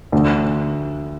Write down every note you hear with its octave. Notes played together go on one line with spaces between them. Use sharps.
D2